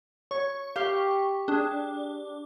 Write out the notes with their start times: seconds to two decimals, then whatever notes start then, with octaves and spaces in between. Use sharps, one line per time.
0.31 C#5 C#6
0.76 G4 F5
1.48 D4 G#4